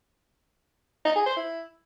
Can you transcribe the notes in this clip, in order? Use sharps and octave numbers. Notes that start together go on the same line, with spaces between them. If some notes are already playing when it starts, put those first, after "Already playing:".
D#4
G#4
C5
E4